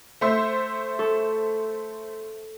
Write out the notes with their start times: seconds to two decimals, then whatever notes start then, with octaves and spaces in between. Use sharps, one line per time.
0.21 A3 C5 E5
0.99 A4 C#6